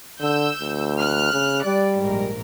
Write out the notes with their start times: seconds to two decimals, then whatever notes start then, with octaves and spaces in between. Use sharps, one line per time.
0.20 D3 E6 G6
0.61 D2
0.97 F6 F#6
1.33 C#3
1.65 G3 D5
2.00 A#1 G#2 A#4